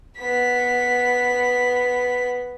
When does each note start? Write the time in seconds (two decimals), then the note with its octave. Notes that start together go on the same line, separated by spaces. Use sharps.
0.18 B3 B6